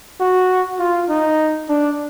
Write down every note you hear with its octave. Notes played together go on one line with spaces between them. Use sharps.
F#4
F4
D#4
D4